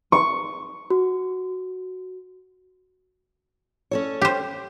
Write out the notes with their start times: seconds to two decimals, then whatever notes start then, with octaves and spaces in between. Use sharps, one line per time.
0.12 C#6
0.90 F#4
3.91 C#4 A4 C#5
4.22 G4 C5